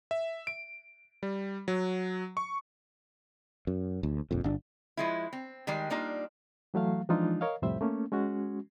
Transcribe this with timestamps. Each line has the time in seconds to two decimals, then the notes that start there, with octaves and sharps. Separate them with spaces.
0.11 E5
0.47 D7
1.23 G3
1.68 F#3
2.37 C#6
3.67 F#2
4.03 D2
4.31 D#1 A#1 F2
4.44 G1 D4
4.97 F3 G#3 E4
5.33 C4
5.67 D#3 G3 G#3 D5
5.90 G3 A#3 D4 D#4 F4
6.74 E3 F#3 A3 F5
7.09 E3 F3 G#3 D4 D#4 F4
7.41 A#4 C#5 D#5 F5
7.62 C2 F2 A2 G3 C5 E5
7.81 A3 A#3 C#4
8.12 G#3 C#4 F#4